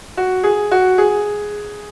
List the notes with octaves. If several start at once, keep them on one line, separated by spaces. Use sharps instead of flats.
F#4
G#4
F#4
G#4